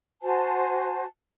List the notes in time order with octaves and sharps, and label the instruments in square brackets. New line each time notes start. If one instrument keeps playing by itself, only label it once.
[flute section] F#4 C5 G#5 A5